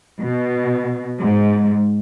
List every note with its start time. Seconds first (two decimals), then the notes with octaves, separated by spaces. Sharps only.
0.21 B2
1.21 G#2